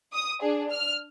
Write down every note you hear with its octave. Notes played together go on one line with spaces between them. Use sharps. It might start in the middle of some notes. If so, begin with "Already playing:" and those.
D#6
D4 G#4
F6